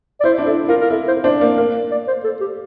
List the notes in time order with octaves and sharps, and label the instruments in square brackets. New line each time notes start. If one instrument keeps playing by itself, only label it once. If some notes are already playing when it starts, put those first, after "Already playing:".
[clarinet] D5
[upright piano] E4 [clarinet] C5
[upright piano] D4
[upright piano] E4 [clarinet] A4
[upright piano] F4 [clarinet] A#4
[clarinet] A#4
[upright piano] E4 [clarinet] A4
[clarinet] C5
[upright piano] D4 [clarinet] C5
[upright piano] A#3 [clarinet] D5
[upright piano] A#3 [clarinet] A#4
[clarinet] D5
C5
A4
G4